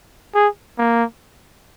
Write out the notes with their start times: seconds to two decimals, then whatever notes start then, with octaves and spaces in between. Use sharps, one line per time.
0.35 G#4
0.78 A#3